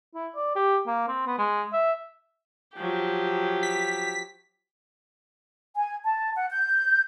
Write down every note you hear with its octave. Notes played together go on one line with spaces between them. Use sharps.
E4
D5
G4
A#3
C4
B3
G#3
E5
F3 F#3 G4
B6
G#5
A5
F#5
G6